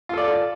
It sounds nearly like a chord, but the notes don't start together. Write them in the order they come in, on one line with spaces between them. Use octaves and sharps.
F4 A4 D5